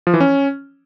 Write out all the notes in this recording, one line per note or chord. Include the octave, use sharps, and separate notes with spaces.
F3
E3
C#4